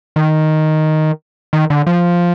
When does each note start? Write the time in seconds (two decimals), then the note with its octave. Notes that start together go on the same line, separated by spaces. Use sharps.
0.16 D#3
1.53 D#3
1.70 D3
1.87 F3